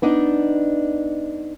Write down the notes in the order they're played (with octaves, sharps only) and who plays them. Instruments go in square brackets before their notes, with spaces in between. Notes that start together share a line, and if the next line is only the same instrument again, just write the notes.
[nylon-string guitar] B3 D4 D#4